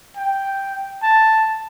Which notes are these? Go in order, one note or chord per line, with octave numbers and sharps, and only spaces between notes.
G5
A5